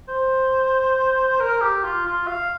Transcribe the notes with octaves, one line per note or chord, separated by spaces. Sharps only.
C5
A#4
G4
F4
F4
F5